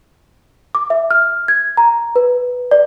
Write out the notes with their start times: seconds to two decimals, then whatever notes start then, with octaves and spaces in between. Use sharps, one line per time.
0.75 D6
0.90 E5
1.11 F6
1.48 G#6
1.77 A#5
2.16 B4
2.71 D5